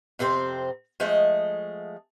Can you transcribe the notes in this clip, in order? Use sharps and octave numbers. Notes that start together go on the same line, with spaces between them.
F2 C3 C4 C5
F3 G#3 A3 D#5